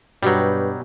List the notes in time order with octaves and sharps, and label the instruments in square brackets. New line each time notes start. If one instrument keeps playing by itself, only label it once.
[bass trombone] G2 [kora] B2 G4 [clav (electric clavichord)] F#3 G3 [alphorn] B4